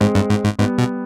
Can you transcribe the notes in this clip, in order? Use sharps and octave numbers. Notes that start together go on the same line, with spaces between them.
G#2 G#3 C4
G2
G#2
G#2
G#2 G3 B3
B2